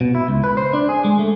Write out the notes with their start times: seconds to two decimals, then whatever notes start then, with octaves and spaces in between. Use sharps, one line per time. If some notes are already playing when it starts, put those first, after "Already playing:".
0.01 B2
0.15 E4
0.28 C#2
0.44 B4
0.57 C5
0.73 D4
0.89 G#4
1.05 G#3
1.19 A3